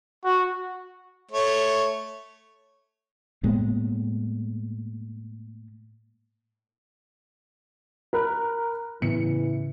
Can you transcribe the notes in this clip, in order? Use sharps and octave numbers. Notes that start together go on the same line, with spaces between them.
F#4
A3 C#5
A2 G#3 A#3 B3
A#4 B5 F#6
A2 C#3 E3 B3 C#7